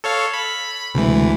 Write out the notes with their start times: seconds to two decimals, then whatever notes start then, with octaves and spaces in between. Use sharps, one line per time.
0.04 A4 C#5 F5
0.34 B5
0.95 D2 C3 E3 G#3